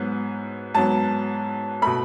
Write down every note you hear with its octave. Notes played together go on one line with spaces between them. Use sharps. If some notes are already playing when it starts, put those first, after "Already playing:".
Already playing: G#2 F#3 B3
G#2 F#3 B3 A5
B2 A3 B5